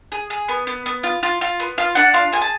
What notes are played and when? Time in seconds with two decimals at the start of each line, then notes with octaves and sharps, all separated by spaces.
0.12 G#4
0.30 G#4
0.48 B3
0.67 B3
0.86 B3
1.03 F4
1.23 F4
1.41 F4
1.60 B3
1.78 F4 F5
1.95 D4 F#5
2.14 F4 F5
2.33 G#4 G#5
2.41 A5